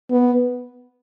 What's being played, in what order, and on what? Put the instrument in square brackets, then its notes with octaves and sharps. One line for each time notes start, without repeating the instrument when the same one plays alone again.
[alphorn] B3